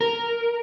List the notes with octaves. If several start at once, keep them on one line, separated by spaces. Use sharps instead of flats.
A#4